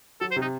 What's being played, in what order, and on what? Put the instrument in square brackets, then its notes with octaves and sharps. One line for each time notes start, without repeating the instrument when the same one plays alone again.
[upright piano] F#3 [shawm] A4
[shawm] C5
[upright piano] C3
[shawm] D#4